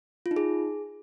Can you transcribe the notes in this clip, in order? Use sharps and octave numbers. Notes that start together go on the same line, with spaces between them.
F4
D#4
G#4